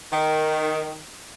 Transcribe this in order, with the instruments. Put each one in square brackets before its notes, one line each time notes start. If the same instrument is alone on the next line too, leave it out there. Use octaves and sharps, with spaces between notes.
[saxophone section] D#3